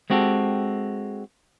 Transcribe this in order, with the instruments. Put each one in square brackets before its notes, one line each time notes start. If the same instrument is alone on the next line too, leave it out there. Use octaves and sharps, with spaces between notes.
[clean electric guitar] G#3 C4 F#4 G4 A4